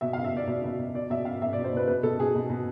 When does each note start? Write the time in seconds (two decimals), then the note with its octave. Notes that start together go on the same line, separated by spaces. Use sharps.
0.01 B2 E5
0.13 F5
0.17 B2
0.24 E5
0.33 B2 D5
0.47 B2 D5
0.64 B2
0.79 B2
0.94 B2 D5
1.10 B2 E5
1.25 B2 F5
1.42 B2 E5
1.53 D5
1.57 B2
1.64 C5
1.73 B2 B4
1.87 B2 B4
2.03 B2 A4
2.19 B2 G#4
2.35 B2
2.50 B2